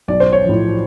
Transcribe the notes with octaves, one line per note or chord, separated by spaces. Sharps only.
B1 D5
C5
C#5
A2 F3